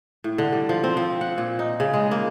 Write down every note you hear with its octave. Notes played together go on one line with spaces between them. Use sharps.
A2
D3
G3
F3
C4
F3
F#5
A#2
D#4
C#3
G#3
A#3